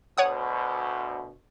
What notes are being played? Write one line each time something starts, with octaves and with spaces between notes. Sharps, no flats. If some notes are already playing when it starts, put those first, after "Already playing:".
D2 B2 C#5 F#5 D#6